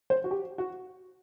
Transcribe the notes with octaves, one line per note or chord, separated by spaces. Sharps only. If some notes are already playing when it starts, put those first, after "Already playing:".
C5
F#4
G4
F#4